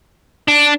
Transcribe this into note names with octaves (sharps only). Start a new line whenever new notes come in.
D4